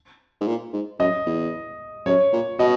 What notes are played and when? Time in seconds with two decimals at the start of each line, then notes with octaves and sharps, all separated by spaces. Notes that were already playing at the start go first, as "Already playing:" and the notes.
0.41 G#2
0.47 A#2
0.73 G#2
0.99 F#2 D#5
1.26 E2
2.06 F#2 C#5
2.32 A#2
2.59 B2 D#5